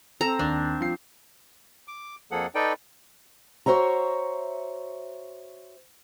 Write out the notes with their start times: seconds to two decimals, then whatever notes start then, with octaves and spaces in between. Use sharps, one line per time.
0.21 C4 A4 A#5 E7
0.39 D#2 D4
0.81 F3 C7
1.88 D6
2.31 F2 F3 A#3 G#4 A4 F#5
2.55 D#4 A4 B4 D5 G5
3.66 F#4 C5 C#5 E5 A#5